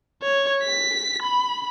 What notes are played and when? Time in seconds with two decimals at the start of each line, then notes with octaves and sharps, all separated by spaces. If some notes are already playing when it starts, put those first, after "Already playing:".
0.23 C#5
0.63 B6
1.23 B5